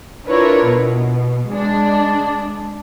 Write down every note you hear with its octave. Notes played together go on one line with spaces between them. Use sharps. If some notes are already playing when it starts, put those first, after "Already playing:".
D4 E4 F4 A#4 B4 C#5
B2
G#3 D4